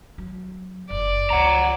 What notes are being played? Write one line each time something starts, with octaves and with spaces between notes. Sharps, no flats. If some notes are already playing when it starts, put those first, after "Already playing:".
F#3
F#1 D5
C#2 F#2 F#5 A#5